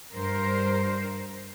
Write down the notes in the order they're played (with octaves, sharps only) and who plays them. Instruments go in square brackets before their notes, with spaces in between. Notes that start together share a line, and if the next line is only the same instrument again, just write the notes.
[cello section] G2 A#4 C5